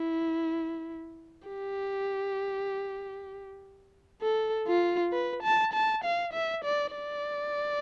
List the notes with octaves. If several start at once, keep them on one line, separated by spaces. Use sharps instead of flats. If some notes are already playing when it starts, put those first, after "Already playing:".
Already playing: E4
G4
A4
F4
B4
A5
A5
F5
E5
D5
D5